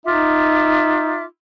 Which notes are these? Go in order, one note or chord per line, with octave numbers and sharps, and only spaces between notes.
D#4 F4 E5 D6